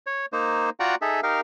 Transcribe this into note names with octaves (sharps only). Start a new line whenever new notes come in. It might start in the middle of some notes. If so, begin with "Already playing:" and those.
C#5
A#3 D#4 C5
F4 F#4 D5 F#5 G5 A#5
D#4 G#4 A4 E5
D#4 G4 A#4 F5